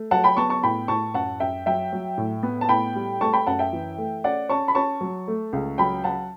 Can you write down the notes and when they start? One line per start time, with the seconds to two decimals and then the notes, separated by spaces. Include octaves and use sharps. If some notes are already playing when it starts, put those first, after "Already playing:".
Already playing: A3
0.11 F#3 F#5 A5
0.24 G5 B5
0.37 B3 A5 C#6
0.50 A5 C#6
0.63 A2 G5 B5
0.88 A2 A5 C#6
1.14 F#2 F#5 A5
1.40 F#2 E5 G5
1.66 F#3 E5 G5
1.93 F#3
2.18 A2
2.43 B3
2.61 A5
2.69 A2 G5 B5
2.96 G3
3.21 A3 A5 C#6
3.33 G5 B5
3.46 F#2 F#5 A5
3.59 E5 G5
3.73 E3
3.98 A3
4.24 C#4 D5 F#5
4.49 C#4 A5 C#6
4.68 B5
4.75 C#4 A5 C#6
5.01 F#3
5.28 A3
5.53 C#2
5.78 F#3 G5 B5
6.04 F#3 F#5 A5